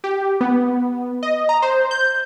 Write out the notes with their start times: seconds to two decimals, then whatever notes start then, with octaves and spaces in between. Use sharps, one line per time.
0.04 G4
0.41 B3
1.23 D#5
1.49 A#5
1.62 C5
1.91 G6